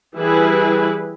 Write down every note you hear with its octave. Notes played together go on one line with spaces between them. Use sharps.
E3 G3 E4 G#4 B4